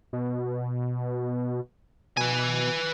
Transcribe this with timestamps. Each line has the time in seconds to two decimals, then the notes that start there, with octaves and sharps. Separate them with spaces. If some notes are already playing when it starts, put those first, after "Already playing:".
0.13 B2
2.17 B2 B4 G#5